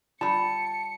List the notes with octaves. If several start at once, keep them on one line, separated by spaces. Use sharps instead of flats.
G3 F4 B4 A5 B5 C#7